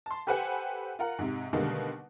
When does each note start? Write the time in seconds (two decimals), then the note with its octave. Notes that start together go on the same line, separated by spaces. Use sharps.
0.06 A5 C6
0.27 G4 A4 B4 C5 F#5 G#5
0.99 F4 A#4 F#5
1.19 G#2 C3
1.53 B2 D3 D#3 G3 G#3 A#3